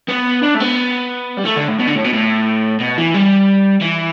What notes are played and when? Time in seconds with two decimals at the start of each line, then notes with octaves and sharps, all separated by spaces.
0.09 B3
0.43 D4
0.55 A3
0.60 B3
1.37 G3
1.45 A3
1.57 D3
1.68 A2
1.79 B2
1.87 D3
1.96 A2
2.04 B2
2.13 A2
2.80 B2
2.98 E3
3.14 G3
3.82 E3